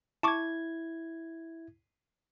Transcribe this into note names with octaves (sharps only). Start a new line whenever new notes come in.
E4 A5 C#6 D6 G#6